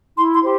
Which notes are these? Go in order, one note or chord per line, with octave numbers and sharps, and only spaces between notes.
E4 C6
C6
G4 C5